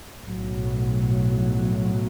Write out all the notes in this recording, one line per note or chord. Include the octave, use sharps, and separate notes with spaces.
B1 A2 F#3